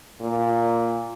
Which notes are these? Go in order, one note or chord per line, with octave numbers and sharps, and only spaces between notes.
A#2